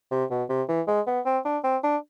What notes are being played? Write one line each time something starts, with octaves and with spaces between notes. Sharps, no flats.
C3
B2
C3
E3
G#3
B3
C4
D4
C4
D4